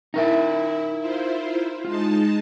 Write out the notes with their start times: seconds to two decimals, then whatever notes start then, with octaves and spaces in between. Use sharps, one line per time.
0.14 D#4 E4 A#4 E5
1.00 E4 F4 C5
1.85 G#3 D#4 F4 A5